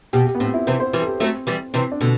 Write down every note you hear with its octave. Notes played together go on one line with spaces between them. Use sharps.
B2 G4
G4
B3
A2 C4
E4
C3 E3 C5
C5
E3 G3 B4
A4
G4
F#3 A3 C4
E3 G3
C3 E3 C4
D4
B2 D3 A4